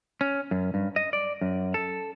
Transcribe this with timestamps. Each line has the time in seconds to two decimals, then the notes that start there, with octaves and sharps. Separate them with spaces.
0.21 C#4
0.51 F#2
0.74 G2
0.96 D#5
1.13 D5
1.41 F#2
1.74 A4